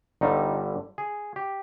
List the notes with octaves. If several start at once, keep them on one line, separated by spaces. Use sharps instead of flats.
G1 G2 D3 G3 D#4
G#4
G4